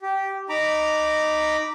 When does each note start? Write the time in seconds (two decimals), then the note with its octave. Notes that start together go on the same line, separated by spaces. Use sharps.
0.02 G4
0.49 D#4 A#5 B5 D6